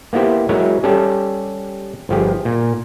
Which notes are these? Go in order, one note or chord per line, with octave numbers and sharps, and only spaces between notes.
A#3 B3 E4 G4 C5
F#3 G#3 E4 A#4 C#5
G3 C#4 G4 A4
G1 F3 G4 G#4
A#2